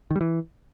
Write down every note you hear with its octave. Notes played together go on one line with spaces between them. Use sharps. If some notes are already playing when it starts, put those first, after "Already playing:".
D#3
G3
E3